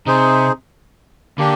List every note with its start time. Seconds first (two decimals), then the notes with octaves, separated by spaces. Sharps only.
0.06 C3 D#4 G#4 C5
1.38 D3 A#3 D4 G4